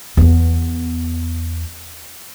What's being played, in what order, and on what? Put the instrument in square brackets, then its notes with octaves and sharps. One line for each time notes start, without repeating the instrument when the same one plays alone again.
[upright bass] E2 B3